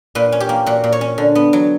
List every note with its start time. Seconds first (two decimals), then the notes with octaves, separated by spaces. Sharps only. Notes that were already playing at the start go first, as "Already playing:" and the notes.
0.15 A#2 B4
0.32 C#4
0.40 G4
0.49 A#3
0.66 A#2 F#4
0.84 A#2
0.92 C#5
1.01 C#4
1.18 D3
1.35 B3
1.53 F#3